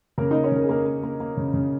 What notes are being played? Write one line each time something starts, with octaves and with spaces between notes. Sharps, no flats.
C#3 A#3 A#4
A#3 D#4 D#5
C#4 C#5
C#3 A#4
G#4
A#3 A#4
A#3
A#3
A#3
C#3
C#3